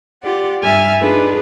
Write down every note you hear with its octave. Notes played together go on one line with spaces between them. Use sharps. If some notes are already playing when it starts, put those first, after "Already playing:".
F4 G4 D5 F#5
G2 G3 E5 G#5 F6 A6
D4 D#4 F4 G#4 A4 B4